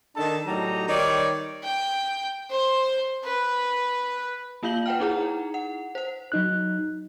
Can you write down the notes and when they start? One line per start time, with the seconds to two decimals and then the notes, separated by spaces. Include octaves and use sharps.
0.16 D#3 D4 A4 D#5 A5
0.45 A2 F#3 G3 D#4 A#5
0.88 D#3 G3 D#4 C#5 D5
1.64 G5
2.51 C5
3.24 B4
4.63 A#3 F4 F5 G6 F#7 G7
4.86 B4 F#5 G5 F6
5.00 D#4 E4 G#4 F#5 A#5
5.54 F#5
5.95 C5 F#5
6.32 F#3 D#4 F#6